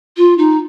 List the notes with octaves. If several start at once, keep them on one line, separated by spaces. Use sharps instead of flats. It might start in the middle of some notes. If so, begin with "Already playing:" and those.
F4
D#4